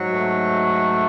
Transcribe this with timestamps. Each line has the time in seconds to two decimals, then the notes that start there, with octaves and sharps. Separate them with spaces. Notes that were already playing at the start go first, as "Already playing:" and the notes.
Already playing: G#2 F#3
0.13 A3